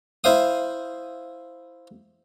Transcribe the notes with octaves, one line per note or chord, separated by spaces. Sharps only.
E4 C5 F5 D#6